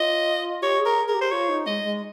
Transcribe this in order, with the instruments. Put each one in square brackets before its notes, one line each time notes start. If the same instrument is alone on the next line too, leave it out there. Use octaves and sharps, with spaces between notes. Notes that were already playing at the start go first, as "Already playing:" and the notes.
Already playing: [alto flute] F4 [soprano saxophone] D#5
[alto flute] G4 [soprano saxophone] C#5
[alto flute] G#4
[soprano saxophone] A#4
[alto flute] G#4 [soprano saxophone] A#4
[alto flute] G4
[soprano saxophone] C5
[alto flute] F4 [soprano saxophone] C#5
[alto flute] D#4
[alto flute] G#3 [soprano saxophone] D#5
[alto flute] G#3